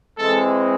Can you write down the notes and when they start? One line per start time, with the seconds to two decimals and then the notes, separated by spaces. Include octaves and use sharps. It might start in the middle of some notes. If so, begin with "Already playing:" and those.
0.18 E3 G#3 C4 A4